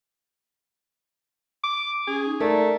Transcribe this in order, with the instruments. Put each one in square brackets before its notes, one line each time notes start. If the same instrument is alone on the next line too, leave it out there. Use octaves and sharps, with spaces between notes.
[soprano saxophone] D6
[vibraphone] C#4 [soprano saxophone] G#4
[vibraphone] D#4
[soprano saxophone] A3 [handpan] A#4 [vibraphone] D5